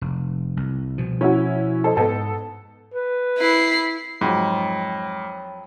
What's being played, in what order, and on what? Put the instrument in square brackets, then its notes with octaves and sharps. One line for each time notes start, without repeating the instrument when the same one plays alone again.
[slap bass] F1
C2
B2 F3
[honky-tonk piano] C#4 E4 F#4
A4 C5 D#5
[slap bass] G#2 [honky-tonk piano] B3 A4
[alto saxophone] B4
[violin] E4 C7
[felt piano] F2 F#3 [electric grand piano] G#2 [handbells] C#5 G5 B5